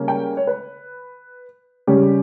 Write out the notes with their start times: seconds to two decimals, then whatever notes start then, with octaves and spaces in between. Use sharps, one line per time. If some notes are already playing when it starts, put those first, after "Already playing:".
Already playing: C#3 G3 A#3 C#4
0.08 G5
0.37 C#5
0.47 B4
1.87 C#3 G3 C#4 G4